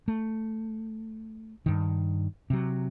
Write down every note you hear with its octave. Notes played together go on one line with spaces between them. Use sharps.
A3
G2 D#3
C3 F#3